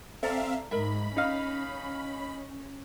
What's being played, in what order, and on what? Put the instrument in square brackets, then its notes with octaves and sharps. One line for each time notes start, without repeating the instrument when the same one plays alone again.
[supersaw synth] C4 E5 F5 [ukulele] A4 D5 A#5
[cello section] G#2 [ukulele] A#4 D#5 E5 [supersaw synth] B5
[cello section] C#4 [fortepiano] D#4 F5